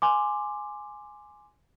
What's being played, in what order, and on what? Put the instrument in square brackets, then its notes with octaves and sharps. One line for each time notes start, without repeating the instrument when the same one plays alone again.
[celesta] G#5 C6 D6